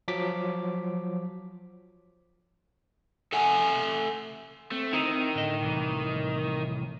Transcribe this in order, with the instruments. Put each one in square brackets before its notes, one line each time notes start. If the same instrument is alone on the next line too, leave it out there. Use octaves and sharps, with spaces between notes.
[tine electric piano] F3 F#3 D6 B6
[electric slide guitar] A4 E5 F#5 G#5
[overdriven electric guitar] A3 [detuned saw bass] C4
[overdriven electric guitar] D#3 [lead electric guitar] D#4 E4
[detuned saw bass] A2 [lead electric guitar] D3 D#5
[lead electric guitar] C2 E3